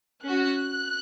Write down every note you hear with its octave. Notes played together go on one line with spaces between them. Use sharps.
C#4 F#6
F#4